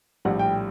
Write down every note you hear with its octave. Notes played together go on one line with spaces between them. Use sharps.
A#1 A2 G3 F#5
G5